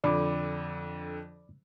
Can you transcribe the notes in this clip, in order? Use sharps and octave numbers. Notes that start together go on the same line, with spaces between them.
F2 D3 D5 B5 D6